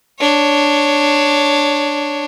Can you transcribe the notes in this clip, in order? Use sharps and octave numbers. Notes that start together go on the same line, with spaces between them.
D4 C#5